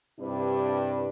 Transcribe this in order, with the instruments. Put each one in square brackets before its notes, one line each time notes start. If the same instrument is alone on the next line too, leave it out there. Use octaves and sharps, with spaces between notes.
[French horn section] G2 C3 G3 D4 E4 B4